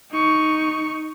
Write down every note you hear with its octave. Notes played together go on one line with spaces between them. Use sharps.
D#4 C#6